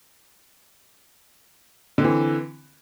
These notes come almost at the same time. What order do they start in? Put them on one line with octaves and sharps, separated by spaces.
D3 C4 E3